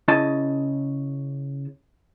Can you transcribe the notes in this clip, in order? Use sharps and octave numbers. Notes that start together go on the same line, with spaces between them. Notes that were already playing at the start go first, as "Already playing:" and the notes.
C#3 E4 D#5 A5